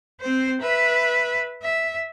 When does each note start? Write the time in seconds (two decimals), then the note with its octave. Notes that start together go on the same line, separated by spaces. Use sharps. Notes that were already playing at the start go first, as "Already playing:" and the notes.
0.21 C4 C5
0.61 B4 E5
1.63 E5